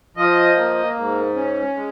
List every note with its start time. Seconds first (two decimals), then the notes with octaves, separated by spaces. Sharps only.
0.17 F3 D#5
0.56 A#3
0.96 G#2
1.35 C#4
1.76 G#3